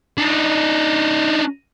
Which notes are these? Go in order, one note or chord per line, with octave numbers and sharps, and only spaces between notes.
D4 D#4